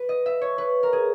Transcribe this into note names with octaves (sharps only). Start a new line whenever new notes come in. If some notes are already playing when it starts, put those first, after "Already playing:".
Already playing: B4
D#5
E5
C#5
B4
A#4
G#4